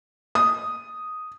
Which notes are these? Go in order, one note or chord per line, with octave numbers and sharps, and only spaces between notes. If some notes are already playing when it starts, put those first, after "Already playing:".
D#6